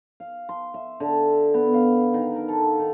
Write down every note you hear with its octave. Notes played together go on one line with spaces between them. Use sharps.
F5
C6
E5
D3
B3
F5
D#3
A#4
A4
D#3